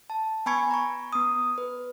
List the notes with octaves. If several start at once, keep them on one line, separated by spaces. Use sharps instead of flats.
A5
B3 G#5 B5 C#6 G#6 C#7
A#5 C#6
B3 D#6
B4